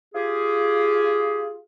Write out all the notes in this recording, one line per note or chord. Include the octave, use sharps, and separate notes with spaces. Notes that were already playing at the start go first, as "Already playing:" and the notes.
F4 G4 G#4